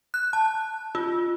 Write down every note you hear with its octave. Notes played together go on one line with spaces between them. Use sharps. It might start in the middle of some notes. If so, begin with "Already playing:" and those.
F#6
A5
F4